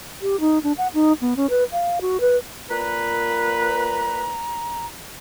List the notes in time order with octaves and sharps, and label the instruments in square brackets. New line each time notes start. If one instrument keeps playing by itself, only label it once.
[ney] G4
D#4
D4
F#5
D#4
B3
C#4
B4
F5
F#4
B4
[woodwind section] A#2 B4 [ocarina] A#5